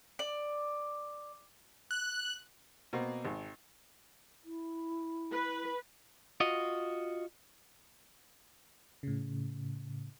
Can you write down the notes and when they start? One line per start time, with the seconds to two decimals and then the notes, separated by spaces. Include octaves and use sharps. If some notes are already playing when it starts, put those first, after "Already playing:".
0.19 D5
1.91 F#6
2.93 B2 A#3 C4
3.25 G#1
4.45 E4
5.32 B4
6.40 F4 F#4 D#5
9.03 A2 C#3